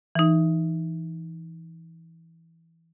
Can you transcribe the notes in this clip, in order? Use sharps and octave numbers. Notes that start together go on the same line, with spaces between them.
E3 D#4